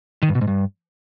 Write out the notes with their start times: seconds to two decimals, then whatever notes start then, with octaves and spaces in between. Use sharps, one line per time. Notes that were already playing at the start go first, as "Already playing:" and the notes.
0.22 D#3
0.29 G2
0.35 B2
0.41 G#2
0.48 G2